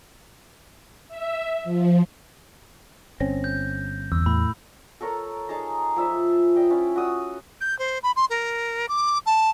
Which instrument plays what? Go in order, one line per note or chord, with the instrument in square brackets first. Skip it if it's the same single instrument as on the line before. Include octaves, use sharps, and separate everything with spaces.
[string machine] E5
F3
[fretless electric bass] G1 C4 C#4 [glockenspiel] A#6
[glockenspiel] G6
[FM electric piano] E2 [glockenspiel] E6
[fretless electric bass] A2 [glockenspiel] B5
[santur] A4 A#4 C#5 A#5
D#4 G#4 A5 A#5
F3 E5 B5
D#5 G5
C#4 E4 F4
F#4 D#6 E6
[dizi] G6
C5
B5
C6
A#4
D6
A5